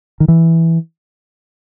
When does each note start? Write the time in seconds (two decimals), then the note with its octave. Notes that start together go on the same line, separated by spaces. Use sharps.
0.20 D#3
0.28 E3